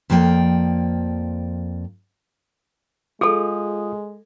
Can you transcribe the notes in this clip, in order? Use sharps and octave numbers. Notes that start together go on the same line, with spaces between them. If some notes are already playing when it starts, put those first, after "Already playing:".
F2 F3 A#3 D5 G5
G#3 F4 G#4 A4 D#6